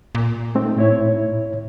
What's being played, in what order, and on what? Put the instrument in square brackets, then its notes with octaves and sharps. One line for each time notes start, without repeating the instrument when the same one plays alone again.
[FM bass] A#2
[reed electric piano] A3 C4 D#4
A2 E4 C#5